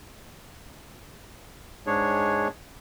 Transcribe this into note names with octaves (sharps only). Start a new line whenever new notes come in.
G#2 G#3 D4 G#4 C#5